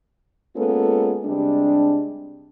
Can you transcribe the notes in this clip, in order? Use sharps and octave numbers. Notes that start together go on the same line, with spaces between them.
G#3 A#3 B3 C#4 F4 A4
C3 G3 G#3 D4